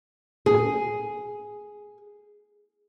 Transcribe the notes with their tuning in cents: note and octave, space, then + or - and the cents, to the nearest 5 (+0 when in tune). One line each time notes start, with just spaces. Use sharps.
G#4 +0